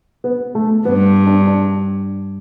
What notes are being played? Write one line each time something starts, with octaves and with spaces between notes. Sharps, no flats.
B3
A3
G2 B3
D4
D4